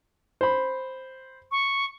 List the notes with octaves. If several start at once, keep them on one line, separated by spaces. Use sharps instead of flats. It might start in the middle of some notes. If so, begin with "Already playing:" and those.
C5 B5
C#6